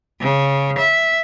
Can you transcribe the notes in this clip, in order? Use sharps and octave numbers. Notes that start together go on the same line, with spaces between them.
C#3
E5